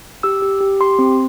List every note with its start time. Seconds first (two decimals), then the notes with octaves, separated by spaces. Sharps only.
0.23 G4 E6
0.42 G4
0.61 G4
0.80 G4 C6
0.99 C4